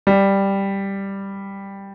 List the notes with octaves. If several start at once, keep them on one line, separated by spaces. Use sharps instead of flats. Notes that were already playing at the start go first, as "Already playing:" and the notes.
G3